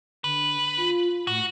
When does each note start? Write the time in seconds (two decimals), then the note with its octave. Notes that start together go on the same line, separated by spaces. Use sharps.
0.24 D3 B4
0.77 F4
1.27 A2 F#4